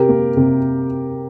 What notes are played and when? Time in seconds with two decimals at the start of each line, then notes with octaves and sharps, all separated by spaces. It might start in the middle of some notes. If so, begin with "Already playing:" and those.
Already playing: C3 G4 A#4
0.09 A#3
0.37 C3